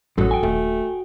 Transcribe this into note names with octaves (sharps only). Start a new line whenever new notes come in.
A1 F#2 F#3 F#4 A4 D#6
G5 G#5
D#1 A3